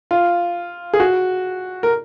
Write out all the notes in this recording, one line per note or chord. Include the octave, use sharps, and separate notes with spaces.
F4
G#4
F#4
A#4